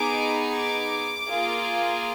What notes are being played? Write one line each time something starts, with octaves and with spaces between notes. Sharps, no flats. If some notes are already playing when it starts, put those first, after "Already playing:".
Already playing: B3 D#4 G#4 D6
D6
A#3 F4 G#4